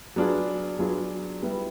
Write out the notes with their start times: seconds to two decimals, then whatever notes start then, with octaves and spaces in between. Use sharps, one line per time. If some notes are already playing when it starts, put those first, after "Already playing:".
0.16 F#3 B3 D4 F4 G#4
0.79 F#3 B3 D4 F4 G#4
1.42 G3 B3 E4